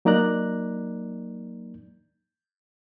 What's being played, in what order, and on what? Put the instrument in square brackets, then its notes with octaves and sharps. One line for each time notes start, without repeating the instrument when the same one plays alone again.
[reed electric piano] F#3 A#3 D#4 D5 A#5 F#6